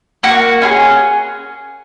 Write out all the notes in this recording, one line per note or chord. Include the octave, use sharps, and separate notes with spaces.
A#3 F#4 F#5
C#4 F4 G#4